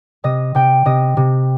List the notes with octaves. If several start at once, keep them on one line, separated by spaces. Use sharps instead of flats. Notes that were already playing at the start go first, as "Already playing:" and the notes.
C3 D#5
C3 G5
C3 D#5
C3